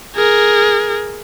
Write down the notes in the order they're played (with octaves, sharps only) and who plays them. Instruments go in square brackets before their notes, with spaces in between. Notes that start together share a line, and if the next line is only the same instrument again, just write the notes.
[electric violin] G#4 A#4